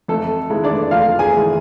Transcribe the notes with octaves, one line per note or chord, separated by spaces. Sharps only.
F2 A3 A4
E3 G#3
D4 D5
F2 F4 F5
G#4 G#5
E3 G#3